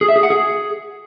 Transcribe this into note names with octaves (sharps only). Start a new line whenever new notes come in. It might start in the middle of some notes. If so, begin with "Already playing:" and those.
G#4
E5
G#4
F#5
G#4